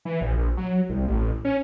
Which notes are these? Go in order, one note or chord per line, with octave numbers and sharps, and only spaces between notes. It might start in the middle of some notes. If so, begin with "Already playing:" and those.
E3
A#1
A#1
F#3
C2
A1
C#4